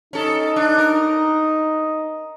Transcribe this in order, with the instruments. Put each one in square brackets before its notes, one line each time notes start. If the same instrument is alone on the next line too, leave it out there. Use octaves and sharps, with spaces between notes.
[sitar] C#4 A4 [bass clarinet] D#4
[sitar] D4
A#4